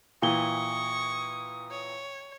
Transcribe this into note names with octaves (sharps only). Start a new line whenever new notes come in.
A#2 E3 G5 C#6 D#6 G7
C#5